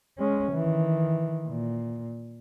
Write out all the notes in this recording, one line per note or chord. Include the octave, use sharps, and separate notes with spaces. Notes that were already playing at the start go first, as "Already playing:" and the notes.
G#3 C#4
D#3 E3
A#2